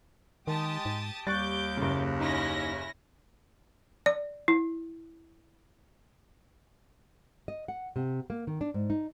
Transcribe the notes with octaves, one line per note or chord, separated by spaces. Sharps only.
D#3 G#3 G4 A5 D#6
G#2
D#2 G3 C#6 D6 F#6 G6 A6
F#1 C#3
C#4 D#4 E4 A#6
D5
E4
D#5
F#5
C3
A#3
D#3
D4
G#2
D#4